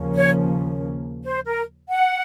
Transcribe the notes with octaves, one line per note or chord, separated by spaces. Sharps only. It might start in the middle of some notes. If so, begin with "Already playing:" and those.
Already playing: D#2 C#3 F3 A#3 C#4
C#5
C5
A#4
F#5